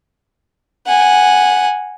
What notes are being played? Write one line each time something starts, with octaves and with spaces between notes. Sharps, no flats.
F#5 G#5